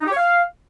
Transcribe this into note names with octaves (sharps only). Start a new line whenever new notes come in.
D#4
G4
C#5
F5